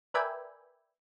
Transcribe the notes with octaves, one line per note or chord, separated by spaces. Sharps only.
A#4 B4 D5 E5 G5 G#5